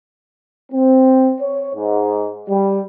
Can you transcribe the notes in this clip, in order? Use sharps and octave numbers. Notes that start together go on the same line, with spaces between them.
C4
C#5
G#2
G3